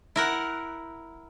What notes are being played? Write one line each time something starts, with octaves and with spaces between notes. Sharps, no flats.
E4 A#4 F#5